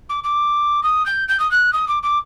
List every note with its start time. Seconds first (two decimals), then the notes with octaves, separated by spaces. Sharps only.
0.09 D6
0.24 D6
0.83 D#6
1.06 G6
1.28 G6
1.39 D#6
1.51 F#6
1.73 D#6
1.88 D6
2.03 D6